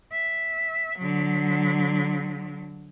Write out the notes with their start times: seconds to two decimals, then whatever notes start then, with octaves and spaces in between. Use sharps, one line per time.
0.12 E5
0.98 D3 F#3